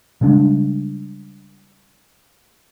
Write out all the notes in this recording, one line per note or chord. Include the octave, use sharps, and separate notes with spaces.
C#3 G3 G#3 D4